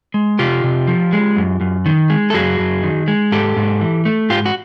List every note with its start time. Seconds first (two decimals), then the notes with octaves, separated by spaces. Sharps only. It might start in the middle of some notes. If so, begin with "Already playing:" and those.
0.14 G#3
0.39 C3 F4 G4
0.64 C3
0.87 F3
1.13 G#3
1.37 F#2
1.61 F#2
1.86 D#3
2.10 G#3
2.30 A4
2.34 F#2 F#4 G#4
2.59 F#2
2.83 D#3
3.08 G#3
3.32 G#2 G4 A4
3.57 G#2
3.81 E3
4.05 A3
4.30 G#2 F4 G4
4.46 F#4